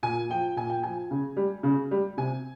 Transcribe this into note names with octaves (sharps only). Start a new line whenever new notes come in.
A#2 G#5
F3 G5
A#2 G#5
G5
F3 G#5
C#3
G3
C#3
G3
C3 G#5